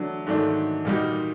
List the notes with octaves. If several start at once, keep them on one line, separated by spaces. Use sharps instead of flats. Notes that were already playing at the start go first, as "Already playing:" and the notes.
Already playing: D3 F#3 A3 D4
G#2 D#3 F#3 A3 D4
A#2 G3 A#3 D#4 F#4